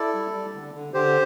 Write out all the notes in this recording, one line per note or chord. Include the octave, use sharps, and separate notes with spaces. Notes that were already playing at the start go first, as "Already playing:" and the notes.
Already playing: E4 A4 D5
G3
G3
D3
D3
D3 G4 C5